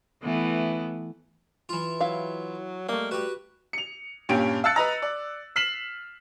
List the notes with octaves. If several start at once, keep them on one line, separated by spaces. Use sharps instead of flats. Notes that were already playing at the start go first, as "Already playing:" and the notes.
E3 A3 B3
E3 F4
F#3 E4 F5
G3 A3 A#3 D#5
F#4 G4 B4
C#7 F7
G2 A#2 C#4 G4 D7
F5 A5 E6 F#6 A6 C#7
B4 D#5 A#5
D5
F6 B6 C7 E7 F#7